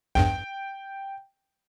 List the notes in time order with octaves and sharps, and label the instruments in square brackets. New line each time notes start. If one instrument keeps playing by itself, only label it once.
[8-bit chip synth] A#1 E2 G2 [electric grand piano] G5